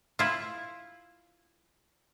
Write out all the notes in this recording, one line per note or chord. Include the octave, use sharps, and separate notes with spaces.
E4 F4